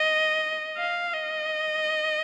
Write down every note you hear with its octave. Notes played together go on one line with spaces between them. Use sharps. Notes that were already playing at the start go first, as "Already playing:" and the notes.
Already playing: D#5
F5
D#5